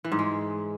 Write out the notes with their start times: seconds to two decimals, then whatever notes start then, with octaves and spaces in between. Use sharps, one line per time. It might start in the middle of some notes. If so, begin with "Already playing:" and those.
0.04 E3
0.12 G#2
0.19 G#3